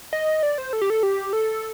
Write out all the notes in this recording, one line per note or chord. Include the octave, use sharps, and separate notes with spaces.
D#5
D5
C5
A4
G4
A4
G4
A4